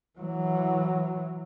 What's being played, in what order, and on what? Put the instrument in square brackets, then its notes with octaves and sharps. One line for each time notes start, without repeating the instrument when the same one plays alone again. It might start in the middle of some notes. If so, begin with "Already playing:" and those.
[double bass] E3 F#3